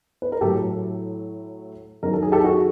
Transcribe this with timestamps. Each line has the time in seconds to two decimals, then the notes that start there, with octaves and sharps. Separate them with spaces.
0.22 B4
0.32 A#4
0.41 A2 F#3 A3 G4 A4
2.03 F#2 D#3 F#3 A#4
2.13 A4
2.23 G#4
2.32 G4 A4
2.44 F#4 G#4